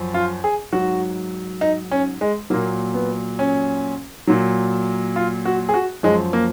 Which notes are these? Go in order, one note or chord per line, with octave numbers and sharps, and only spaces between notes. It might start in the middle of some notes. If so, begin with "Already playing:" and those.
Already playing: F#2 F3
F4
G#4
G#2 F#3 F#4
D#4
C#4
G#3
A#2 F#3 A#3
B3
C#4
A#2 F#3
F4
F#4
G#4
F#4
F#2 F3 G#3
A#3